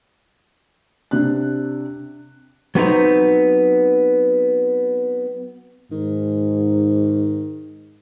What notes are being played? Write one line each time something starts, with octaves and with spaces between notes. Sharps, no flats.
C3 D4 F#6
F#3 B3 C4 D#4
G#2 D#3